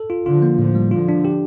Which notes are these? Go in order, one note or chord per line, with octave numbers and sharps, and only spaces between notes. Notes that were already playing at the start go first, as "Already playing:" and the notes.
Already playing: A4
F4
D3 F3 F4
A#3
A2 D3 F3
G3
D3 F3 F4
D4
G4